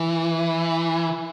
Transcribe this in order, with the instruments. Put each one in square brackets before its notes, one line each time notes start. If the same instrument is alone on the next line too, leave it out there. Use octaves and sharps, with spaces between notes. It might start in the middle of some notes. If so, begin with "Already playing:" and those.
Already playing: [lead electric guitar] E3